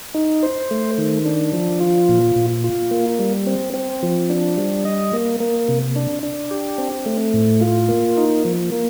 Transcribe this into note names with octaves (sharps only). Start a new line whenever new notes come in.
D#4
C5
A3
D#3
D4
F3
F4
A#2
A#2
F4
A#3
G3
C4
C4
F3
D4
G3
D#5
A#3
A#3
C3
D4
D4
G4
C4
A3
A2
F4
A#3
D#4
F3
A#3